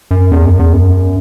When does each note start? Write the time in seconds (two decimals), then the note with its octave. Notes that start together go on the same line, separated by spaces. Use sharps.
0.11 F#2
0.31 E2
0.45 F#2
0.59 E2
0.73 F#2